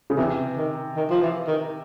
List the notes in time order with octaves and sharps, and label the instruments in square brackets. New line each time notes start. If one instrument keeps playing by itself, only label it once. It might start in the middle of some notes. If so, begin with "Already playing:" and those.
[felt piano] C#3
[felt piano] C3 [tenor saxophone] E3
[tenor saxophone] D#3
D#3
F3
E3
D#3